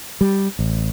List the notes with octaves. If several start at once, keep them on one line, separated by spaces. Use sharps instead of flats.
G3
A1